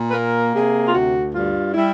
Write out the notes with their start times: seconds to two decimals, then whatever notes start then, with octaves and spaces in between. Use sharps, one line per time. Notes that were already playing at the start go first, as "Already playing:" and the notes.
Already playing: A#2
0.09 B4
0.13 A#3 A#4
0.54 C3 G#4
0.85 F4
0.93 D2 F#4
1.34 G2 F4
1.74 G3 E4